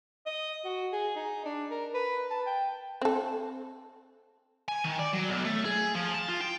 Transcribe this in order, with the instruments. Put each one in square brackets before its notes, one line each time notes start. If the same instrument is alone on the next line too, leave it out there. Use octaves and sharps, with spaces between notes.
[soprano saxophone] D#5
F#4
G#4
D#4
D4
A#4
B4
A5
G5
[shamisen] C4 A4
[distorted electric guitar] G#5
D#3
D5
F#3
B1
A3
G#4
F3
A5
F4
G5